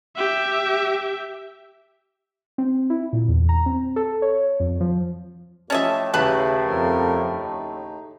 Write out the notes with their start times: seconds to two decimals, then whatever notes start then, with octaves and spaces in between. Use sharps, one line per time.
0.17 G4 E5
2.58 C4
2.90 E4
3.13 A#2
3.28 E2
3.49 A#5
3.66 C4
3.96 A4
4.22 C#5
4.60 F2
4.80 F3
5.70 A2 F3 C#4 G4 D#5 E5 A5
6.14 D#2 C#3 E4 B4 A5 B5
6.63 F2 F3 A#4
7.31 D#4